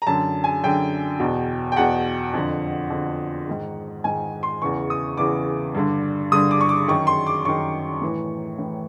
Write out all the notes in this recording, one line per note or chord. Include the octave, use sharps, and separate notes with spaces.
A#5
F#2 D3 A5
G#5
F#2 D3 G5
E2 B2
G5
E2 B2 F#5
F2 D3
F2 D3
G#2 D#3
G#2 D#3 G#5
C6
E2 C#3 E3 C#6
D#6
E2 C#3 E3 D6
G2 D3
G2 D3 D#6
D6
C#6
D6
F#2 D#3 C#6
C6
D6
F#2 D#3 C#6
A2 E3
A2 E3